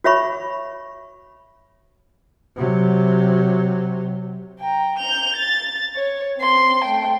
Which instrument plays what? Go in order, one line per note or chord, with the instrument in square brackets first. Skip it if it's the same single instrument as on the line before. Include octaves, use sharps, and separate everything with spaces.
[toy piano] F#4 C#5 E5 B5 C#6
[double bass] C3 F#3
[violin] G5 A#5
G6 F7
A6
C#5
C4 C6
A3 G5